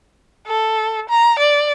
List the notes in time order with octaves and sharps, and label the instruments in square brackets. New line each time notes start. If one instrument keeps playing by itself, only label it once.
[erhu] A4
A#5
D5